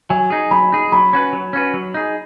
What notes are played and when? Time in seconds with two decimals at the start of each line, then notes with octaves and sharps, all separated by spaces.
0.10 F#3 G#5
0.30 D#4 G#4
0.51 F#3 B5
0.72 D#4 G#4
0.92 F#3 B5
1.13 C#4 F#4 B4
1.33 F#3
1.53 C#4 F#4 B4
1.74 F#3
1.94 D#4 G#4